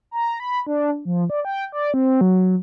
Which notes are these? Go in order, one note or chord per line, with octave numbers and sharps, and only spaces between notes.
A#5
B5
D4
F3
D5
G5
D5
C4
F#3